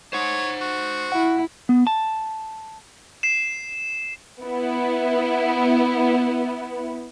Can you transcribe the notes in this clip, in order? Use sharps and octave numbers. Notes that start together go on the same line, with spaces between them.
C5 C#5 F#5
F#4
E4 F#5
B3
A5
C7 E7
B3 E4